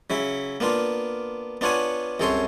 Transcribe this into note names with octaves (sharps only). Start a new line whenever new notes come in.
C#3 F#3 E4
A#3 B3 D4 F4
B3 D4 F4 C#5 F#5 G#5
C2 F#2 G#4 A4 C#5 C6